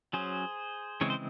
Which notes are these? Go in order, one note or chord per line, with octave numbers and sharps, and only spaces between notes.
F#3 C#4 G#4 C5
C#3 E3 G#3 C4 C#5
C5